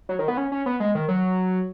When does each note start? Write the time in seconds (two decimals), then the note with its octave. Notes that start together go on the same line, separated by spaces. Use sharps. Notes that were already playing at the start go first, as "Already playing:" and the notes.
0.09 F#3
0.19 D#3
0.28 B3
0.37 C#4
0.52 C#4
0.66 B3
0.80 G#3
0.95 D#3
1.08 F#3